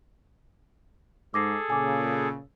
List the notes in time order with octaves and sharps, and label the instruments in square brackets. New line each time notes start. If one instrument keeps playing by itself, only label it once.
[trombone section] G#2 [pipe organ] G#4 A4 [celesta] D6 A#6 C7
[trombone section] A#2 C#3 [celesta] G#5 D6